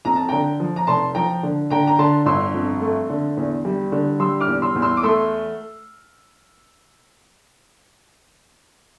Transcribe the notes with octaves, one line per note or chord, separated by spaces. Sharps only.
F2 A#5
A5
D3 G5 A#5
F3
A#5
F1 A5 C6
F3 G5 A#5
D3
D3 G5 A#5
A#5
D3 A5 C6
G1 C6 E6
F2
A3
D3
E2
G3
D3
G3 C6 E6
D6 F6
E2
C6 E6
E2
C6 E6
D6
A3 C6 E6